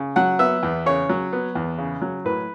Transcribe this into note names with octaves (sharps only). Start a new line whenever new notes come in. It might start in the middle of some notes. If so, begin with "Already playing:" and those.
Already playing: C#3
F#3 F#5
B3 E5
E2
C#3 C#5
F#3
B3
E2
C#3
F#3
A2 B4